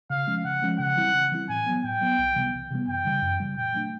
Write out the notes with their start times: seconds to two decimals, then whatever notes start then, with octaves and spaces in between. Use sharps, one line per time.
0.10 C#3 F5
0.27 F3 G#3 C#4
0.44 C#3 F#5
0.63 F3 G#3 C#4
0.79 C#3 F#5
0.97 E3 G3 C4 E4
1.15 C#3
1.32 E3 G3 C4 E4
1.49 A2 G#5
1.66 F#3 B3
1.83 A2 G5
2.01 F#3 B3
2.19 C2
2.36 C3 E3 G3 B3
2.53 C2
2.70 C3 E3 G3 B3
2.88 F#2 G5
3.05 C#3 E3 G3
3.23 F#2
3.40 C#3 E3 G3
3.57 A#2 G5
3.75 F#3 A3 D4